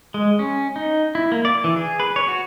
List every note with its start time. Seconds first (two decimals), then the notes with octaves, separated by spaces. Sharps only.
0.14 G#3
0.39 C#4
0.76 D#4
1.15 E4
1.32 A#3
1.45 D5
1.64 E3
1.76 G#4
2.00 B4
2.16 C#5
2.28 F#4